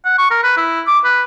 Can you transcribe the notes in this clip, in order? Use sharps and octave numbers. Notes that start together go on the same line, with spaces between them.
F#5
C#6
A#4
B4
E4
D6
B4